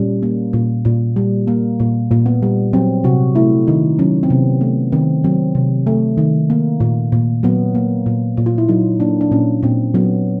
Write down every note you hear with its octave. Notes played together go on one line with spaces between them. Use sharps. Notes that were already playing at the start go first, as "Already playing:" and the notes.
Already playing: A#2 G3 C#4
A#3
A#2
A#2
G3
A#3
A#2
A#2
B3
G3
F#3 C4
C3 F#4
A3 E4
D#3 D#4
F#3 C#4
C4
C3 B3
A3 B3
D#3 C4
F#3 C4
C3
A3
D#3
A#3
A#2
A#2
F#3 B3
A#3
A#2
A#2
F4
E4
F#3 D#4
A#3 D4
D4
A#2 C#4
A#2 C4
F#3 B3